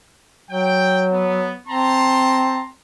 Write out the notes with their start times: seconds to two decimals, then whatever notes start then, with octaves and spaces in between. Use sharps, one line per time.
0.50 F#3 G5
1.12 B3
1.68 C4 A5 A#5 C6